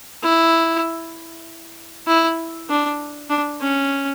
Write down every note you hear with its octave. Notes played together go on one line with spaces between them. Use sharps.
E4
E4
D4
D4
C#4